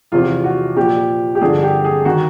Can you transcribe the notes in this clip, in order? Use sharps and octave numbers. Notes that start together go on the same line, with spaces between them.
E2 C3 F3 F4
F#4
A#2 F3 G4
G4
G2 D3 F3 G#4
G4
G#4
D#3 F#4